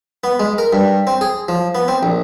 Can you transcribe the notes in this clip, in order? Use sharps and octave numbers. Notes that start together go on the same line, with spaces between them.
B3
G#3
A#4
G2
C4
G#4
F3
B3
C4
A#1